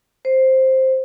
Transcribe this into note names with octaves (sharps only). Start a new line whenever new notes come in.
C5